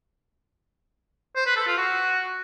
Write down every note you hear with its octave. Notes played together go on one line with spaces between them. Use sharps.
C5
B4
A4
F4
F#4